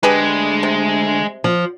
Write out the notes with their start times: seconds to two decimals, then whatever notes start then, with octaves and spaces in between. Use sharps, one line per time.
0.03 D2 G#3 D4 G4 G#4 B4
0.63 C3
1.44 F3